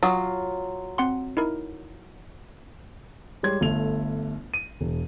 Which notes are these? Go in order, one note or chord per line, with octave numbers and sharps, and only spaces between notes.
F#3 F4 D#6
C4 F#5 C6
D#4 E4 A#4
G3 G#3 C#5 C6 G#6
G1 A3 F7
D#7
E1